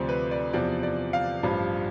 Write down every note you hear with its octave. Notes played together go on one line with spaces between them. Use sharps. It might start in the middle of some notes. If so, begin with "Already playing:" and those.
Already playing: D2 C3 F3 C5 D5
B4
D5
E2 C3 F3 D5
D5
F5
A1 G2 F3